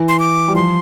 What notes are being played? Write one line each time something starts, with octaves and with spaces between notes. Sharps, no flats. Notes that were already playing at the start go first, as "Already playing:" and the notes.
Already playing: E3
C6
D6
G3
F3 C6